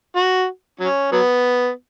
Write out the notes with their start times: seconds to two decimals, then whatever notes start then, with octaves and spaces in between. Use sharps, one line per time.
0.16 F#4
0.80 F#3 C#4
1.12 F#3 B3